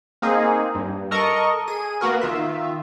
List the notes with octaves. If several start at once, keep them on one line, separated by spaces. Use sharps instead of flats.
A#3 C4 D#4 G#4
G2
A4 A#4 D#5 C#6
G#4 D#7
A#3 B3 F#4 A#4
D#3 F4 E5